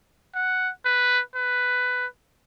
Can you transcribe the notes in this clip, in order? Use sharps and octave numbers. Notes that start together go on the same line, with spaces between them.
F#5
B4
B4